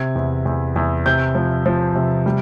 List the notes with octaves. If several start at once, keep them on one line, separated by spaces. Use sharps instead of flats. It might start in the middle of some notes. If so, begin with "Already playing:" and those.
Already playing: C3 G#6
E2
E2
E2
C3 G6
F3
F3
C3
G3